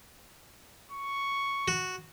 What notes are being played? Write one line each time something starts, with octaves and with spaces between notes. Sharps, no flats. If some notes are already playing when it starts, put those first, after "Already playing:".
C#6
F#4